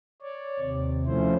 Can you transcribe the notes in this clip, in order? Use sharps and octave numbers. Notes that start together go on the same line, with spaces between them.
C#5 D5
D#2 C3
F3 A3 C#4 E4 C5